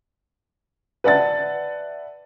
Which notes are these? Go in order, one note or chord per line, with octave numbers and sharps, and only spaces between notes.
B4 D5 E5 F#5 A5 A6